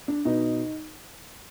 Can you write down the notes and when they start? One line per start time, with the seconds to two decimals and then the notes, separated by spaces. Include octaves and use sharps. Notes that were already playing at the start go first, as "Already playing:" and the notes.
0.08 D4
0.25 B2 D#4